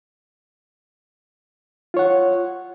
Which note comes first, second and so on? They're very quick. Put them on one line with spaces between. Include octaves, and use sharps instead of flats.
F4 C#5 F#5